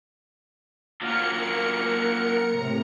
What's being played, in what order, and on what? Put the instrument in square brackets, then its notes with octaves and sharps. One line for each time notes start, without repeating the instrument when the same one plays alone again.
[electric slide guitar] F#3 A#3 F4 [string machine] A#4 C#7
[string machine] A2 C3 A#5